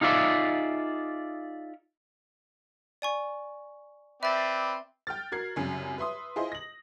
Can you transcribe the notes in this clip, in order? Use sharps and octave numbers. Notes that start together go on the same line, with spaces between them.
D#4 F4 G#4 D5 E5
D5 G#5 C#6
C4 B4 D5 E5 A6
G5 F6 A6
F#4 A#4 G#6 C7
C2 F#2 C#3
B4 E5 C6 D#6
E4 F4 G#4 C5 D#5
A#6 F#7